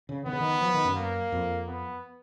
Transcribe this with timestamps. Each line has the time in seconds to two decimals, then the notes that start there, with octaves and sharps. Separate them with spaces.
0.09 C#3
0.26 D#3 B3
0.33 C#3
0.40 D#3
0.61 F3
0.74 D#3
0.85 F#2
0.97 A#3
1.32 F2
1.68 B3